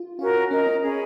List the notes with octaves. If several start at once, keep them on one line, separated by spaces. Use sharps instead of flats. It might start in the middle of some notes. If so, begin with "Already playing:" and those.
Already playing: F4
C#4 F4 F#4 A#4
C#4 A#4 D#5 A#5
C#4
G#4 C#5 G#5 B5